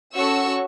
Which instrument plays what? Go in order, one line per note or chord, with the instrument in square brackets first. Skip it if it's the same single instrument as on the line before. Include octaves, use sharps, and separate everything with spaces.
[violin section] C#4 F#4 A4 C#6 E6